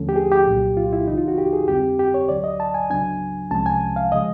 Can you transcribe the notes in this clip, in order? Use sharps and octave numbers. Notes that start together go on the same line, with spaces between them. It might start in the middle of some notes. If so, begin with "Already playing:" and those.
Already playing: D#2 D3 F3 A3 C#4 A4
G4
G#4
G4
C2 A#2 F#3
F4
E4
C#2 C#3 E3 D#4
F4
F#4
G4
G#4
F2 D3 G3 C4 G4
G4
C#5
D2 D3 F#3 D5
D#5
A5
G#5
C#2 C#3 F#3 B3 D4 G#5
C2 C3 F3 G#3 C#4 A5
G#5
F5
C#3 F3 G#3 D#5